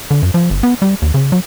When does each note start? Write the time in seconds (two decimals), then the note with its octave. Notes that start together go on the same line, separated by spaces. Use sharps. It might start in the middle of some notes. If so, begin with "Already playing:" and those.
0.11 D3
0.23 F#2
0.34 F3
0.50 G1
0.63 B3
0.82 G3
1.02 D#2
1.14 C#3
1.32 F#3